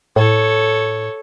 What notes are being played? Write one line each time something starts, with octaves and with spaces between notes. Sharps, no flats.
A2 A4 C#5